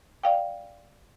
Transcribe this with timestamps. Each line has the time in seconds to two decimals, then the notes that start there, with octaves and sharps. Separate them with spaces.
0.23 D5 F5 G5